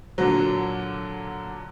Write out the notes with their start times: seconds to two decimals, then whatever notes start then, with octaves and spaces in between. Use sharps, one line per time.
0.18 A#2 D3 F#3